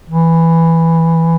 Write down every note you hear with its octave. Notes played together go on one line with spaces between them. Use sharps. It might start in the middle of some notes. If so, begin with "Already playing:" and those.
E3